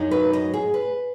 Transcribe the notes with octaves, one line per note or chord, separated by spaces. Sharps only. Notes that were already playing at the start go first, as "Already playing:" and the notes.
Already playing: F#2 F#3 D#4
B4
D#5
G#4
B4